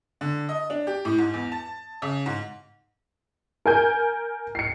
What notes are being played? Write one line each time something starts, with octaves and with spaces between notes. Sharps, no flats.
D3
D#5
D4
G4
A2
G#2
E2
A5
C#3
G#2
A#4 G#5 G6
C7 C#7